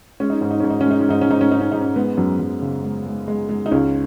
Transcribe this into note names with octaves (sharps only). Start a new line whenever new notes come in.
G#3 C#4
D#4
G#2 C#4
D#4
G#2 C#4
D#4
C#4
G#3 D#4
C#4
G#2 D#4
C#4
G#2 D#4
C#4
G#2 D#4
C#4
G#2 D#4
C#4
G#3 B3
F#2
F#2
C#3
G#3
G#3
G#3
G#3
D#4
C#2 C#4